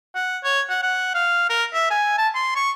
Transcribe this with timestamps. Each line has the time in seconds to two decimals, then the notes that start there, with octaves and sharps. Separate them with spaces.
0.15 F#5
0.44 C#5
0.69 F#5
0.83 F#5
1.14 F5
1.49 A#4
1.74 E5
1.90 G#5
2.18 A5
2.35 C6
2.55 C#6